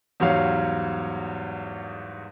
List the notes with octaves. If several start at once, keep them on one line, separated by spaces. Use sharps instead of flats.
E2 G#2 F#3 G3 C#5 F5